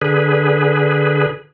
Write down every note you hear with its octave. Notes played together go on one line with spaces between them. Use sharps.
D3 G#4 B4